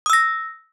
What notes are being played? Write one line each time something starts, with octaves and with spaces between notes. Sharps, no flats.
D#6 E6 A#6